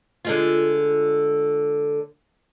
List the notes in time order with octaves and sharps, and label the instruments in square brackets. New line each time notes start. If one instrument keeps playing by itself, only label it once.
[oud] D3 G#3 F4